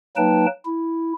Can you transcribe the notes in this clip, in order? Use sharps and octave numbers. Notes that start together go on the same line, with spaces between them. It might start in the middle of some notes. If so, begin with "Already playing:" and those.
F#3 A#3 D#4 B4 G5 A5
E4